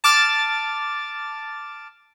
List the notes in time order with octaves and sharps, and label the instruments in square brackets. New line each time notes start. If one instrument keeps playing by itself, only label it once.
[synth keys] A5 D6 F6 A6